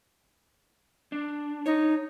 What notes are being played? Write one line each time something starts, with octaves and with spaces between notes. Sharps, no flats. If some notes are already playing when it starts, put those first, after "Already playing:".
D4
D#4 C#5